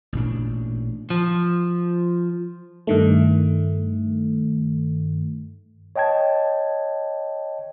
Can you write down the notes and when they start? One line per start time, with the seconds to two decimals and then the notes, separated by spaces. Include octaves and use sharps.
0.13 A1 A#2 D4
1.10 F3
2.87 G2 D#3 A3
5.96 C#5 D#5 G5 A5 G#6